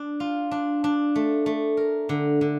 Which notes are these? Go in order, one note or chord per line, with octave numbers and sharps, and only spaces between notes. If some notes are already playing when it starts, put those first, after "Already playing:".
Already playing: D4
F4
D4
D4
A3
A3
A#4
D3
D3